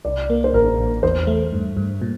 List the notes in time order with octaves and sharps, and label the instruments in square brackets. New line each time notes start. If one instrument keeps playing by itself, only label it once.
[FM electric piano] C2 [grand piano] D5
[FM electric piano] A#3
[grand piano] C5
[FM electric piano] A1 [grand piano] A#4
[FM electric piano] A1
[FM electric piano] E2 [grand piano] C5
[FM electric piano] A3
G2
G2
A#2